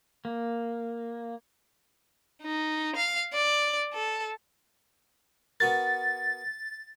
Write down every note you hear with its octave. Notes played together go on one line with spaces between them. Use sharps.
A#3
D#4
F5
D5
A4
B3 F#4 A#4 A6